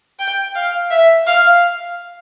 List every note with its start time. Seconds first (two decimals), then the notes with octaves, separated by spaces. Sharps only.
0.19 G5
0.55 F5
0.91 E5
1.27 F5